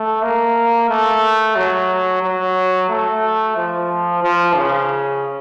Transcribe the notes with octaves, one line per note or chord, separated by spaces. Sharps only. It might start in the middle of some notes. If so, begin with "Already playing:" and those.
Already playing: A3
A#3
A3
F#3
F#3
A3
F3
F3
C#3